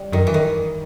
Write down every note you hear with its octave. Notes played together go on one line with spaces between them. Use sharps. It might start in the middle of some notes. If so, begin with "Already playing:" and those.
Already playing: G3
F#2 D#3
E3
D#3